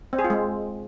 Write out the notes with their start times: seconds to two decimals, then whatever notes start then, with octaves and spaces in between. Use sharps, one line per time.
0.13 C4
0.19 G#4
0.24 F4
0.30 G#3